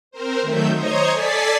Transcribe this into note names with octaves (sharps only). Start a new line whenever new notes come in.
C4 A#4 C5
D#3 F#3 A3 E5 G6
C5 C#5 D#5 A#5 D#6 G#6
A4 D5 G#5 A6 B6 C7